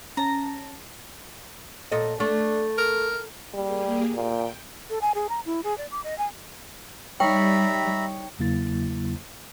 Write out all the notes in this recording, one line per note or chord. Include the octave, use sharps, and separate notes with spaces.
C#4 A5 A#5
A#2 A4 D#5
A3 D4
A#4
G3 A#3 G4 G#4
A#2 G5
A4
G#5
G#4
A#5
E4
G#4
D5
D6
D#5
G#5
G3 D#4 C#5 E5 G5 A#5 B5
E2 C#3 F#3 A#3 E4 A6